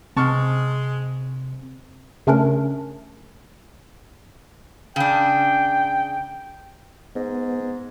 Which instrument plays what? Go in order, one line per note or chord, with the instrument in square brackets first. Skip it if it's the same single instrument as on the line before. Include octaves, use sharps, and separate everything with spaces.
[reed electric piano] C3 [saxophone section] G#3 [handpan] C4 [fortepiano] A5 C#6 F6
[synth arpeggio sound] C#3 A3 C#4 D4 A#4
[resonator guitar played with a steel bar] C#3 D4 [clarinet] G5
[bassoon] G#2 [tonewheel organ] B3